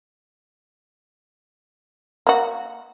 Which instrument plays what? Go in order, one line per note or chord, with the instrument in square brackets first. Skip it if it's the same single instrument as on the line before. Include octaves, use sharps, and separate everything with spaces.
[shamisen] A#3 F#4